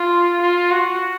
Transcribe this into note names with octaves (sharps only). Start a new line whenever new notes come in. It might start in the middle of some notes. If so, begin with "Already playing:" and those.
Already playing: F4
F4
F#4